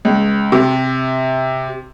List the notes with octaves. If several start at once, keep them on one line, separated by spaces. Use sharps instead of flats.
C#2
C3